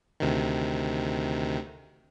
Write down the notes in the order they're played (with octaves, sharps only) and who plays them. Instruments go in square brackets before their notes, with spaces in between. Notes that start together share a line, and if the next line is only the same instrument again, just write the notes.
[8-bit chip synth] D2 C3 D#3